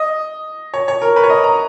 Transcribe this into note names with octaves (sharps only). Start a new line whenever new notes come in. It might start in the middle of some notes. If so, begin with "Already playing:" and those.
Already playing: D#5
C#5
C#5
A#4
B4
C#5
D#5
A#5